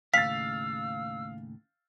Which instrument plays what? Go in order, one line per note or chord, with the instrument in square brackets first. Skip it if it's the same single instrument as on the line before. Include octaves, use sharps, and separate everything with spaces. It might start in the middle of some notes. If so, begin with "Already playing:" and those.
[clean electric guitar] D#2 A2 C#3 [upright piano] F5 A6 [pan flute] E6 [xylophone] B6